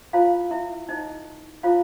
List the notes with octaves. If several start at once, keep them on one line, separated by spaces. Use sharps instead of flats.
E4 F4 A4 C5 F5
E4 E5
D#4 E4 A4 C5 D#5
E4 F4 A4 C5 F5